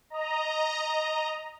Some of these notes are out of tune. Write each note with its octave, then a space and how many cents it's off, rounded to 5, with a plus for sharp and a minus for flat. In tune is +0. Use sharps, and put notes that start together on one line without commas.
D#5 +0 A#5 +0